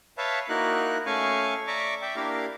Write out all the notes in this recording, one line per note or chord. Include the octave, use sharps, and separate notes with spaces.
B4 C#5 E5 F5 A5
A#3 D#4 E4 F#4 A#4 F#6
A3 C#4 F5 G#5 C#6
D5 E5 A#5 C#6 D6
D5 E5 G5
A#3 D4 E4 G4 A#4 F5